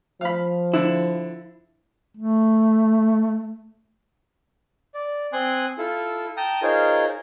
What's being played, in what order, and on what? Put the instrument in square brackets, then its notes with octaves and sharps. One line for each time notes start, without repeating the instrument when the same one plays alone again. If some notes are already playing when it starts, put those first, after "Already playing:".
[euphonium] F3 [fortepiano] F5 B5
[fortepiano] D3 [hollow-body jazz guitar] E4
[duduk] A3
[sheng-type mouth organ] D5
C4 G#5 C6 D#6 F#6
E4 F4 A4
G5 A5 A#5 D#6
D#4 F4 G#4 A#4 C5 C#5